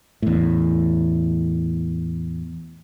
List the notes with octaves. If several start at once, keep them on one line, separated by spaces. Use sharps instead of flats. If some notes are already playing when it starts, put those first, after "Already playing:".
E2 A2